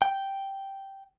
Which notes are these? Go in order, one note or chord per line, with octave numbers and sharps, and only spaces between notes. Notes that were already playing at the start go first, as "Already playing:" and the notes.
G5